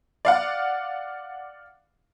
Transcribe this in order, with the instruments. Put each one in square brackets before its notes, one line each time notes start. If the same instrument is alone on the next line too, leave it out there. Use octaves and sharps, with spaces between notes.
[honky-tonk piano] D5 F5 F#5